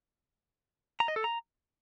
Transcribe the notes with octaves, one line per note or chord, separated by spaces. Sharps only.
A#5
D#5
A4
A#5